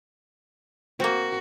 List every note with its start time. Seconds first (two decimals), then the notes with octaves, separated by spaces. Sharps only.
1.00 A#3 C4 F#4